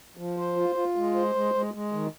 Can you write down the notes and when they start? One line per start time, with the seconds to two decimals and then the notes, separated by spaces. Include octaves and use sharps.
0.17 F3
0.37 C5
0.56 F4
0.75 F4
0.96 G#3
1.15 C5
1.35 G#3
1.54 G#3
1.74 G#3
1.93 D#3